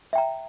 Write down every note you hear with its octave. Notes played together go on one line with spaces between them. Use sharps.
E5 G5 A#5